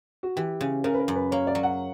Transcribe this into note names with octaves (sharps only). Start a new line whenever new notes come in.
F#4
E3 G4
C#3
C#3 A#4
B4
A#4
F#2
B4
A#3 C#5
D5
F#3
F#5